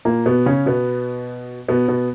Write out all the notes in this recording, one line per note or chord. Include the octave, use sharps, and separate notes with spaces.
A#2 A#3
B2 B3
C#3 C#4
B2 B3
B2 B3
B2 B3